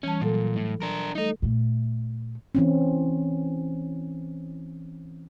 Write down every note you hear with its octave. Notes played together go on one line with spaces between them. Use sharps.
E3 G3 C#4 A5
A#2 F#3 A4
A2
D4 A#4
G3 A3 D#4 A4 D#5
A#2 A3
E3 C4 C#4